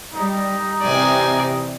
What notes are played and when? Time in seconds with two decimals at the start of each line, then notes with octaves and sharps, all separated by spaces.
0.13 G3 D#4
0.82 C3 E3 C4 D5 G#5